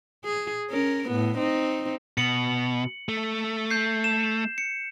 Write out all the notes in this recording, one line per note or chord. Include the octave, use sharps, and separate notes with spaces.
G#4
C#4 A#4
A2 B3
C4 D#4
B2 C#7 F#7
A3
G6 C7
E7
C#7